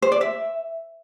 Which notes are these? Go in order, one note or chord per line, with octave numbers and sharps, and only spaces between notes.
C5
D5
E5